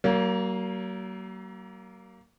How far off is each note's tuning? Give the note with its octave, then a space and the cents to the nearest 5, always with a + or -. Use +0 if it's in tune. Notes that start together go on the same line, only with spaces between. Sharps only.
F#3 +40 A#3 +0